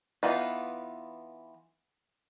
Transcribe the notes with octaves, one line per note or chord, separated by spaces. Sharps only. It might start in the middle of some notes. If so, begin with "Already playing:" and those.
E3 B3 D4 D#4 F4